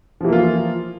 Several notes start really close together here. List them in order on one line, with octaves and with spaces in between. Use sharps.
F3 E3 A#3 F4